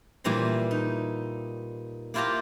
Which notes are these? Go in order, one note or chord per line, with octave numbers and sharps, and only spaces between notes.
A#2 E3 G3 A#5 C6
D#4
A#3 E4 F4 G4 A5 A#5